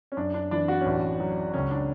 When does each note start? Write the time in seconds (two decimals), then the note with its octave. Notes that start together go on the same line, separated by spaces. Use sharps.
0.12 C#4
0.17 F#2 D4
0.34 D4
0.51 E3 D4
0.68 F#4
0.81 C#4
0.85 A1 D4
1.20 F#3
1.54 C#2 C#4
1.71 D4